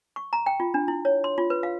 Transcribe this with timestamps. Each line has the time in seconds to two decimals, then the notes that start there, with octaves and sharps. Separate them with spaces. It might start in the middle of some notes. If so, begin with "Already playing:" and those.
0.16 C#6
0.33 A#5
0.46 G5
0.60 F4
0.74 D4
0.88 E4
1.05 C#5
1.24 C6
1.38 F4
1.50 B4
1.63 F5